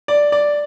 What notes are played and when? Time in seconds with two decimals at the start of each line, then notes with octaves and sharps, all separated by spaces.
0.08 D5
0.32 D5